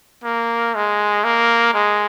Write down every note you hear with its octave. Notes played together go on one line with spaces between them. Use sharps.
A#3
G#3
A#3
G#3